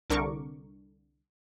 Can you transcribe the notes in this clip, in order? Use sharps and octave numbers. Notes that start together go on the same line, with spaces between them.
C2 D3 A#4 C#6 D6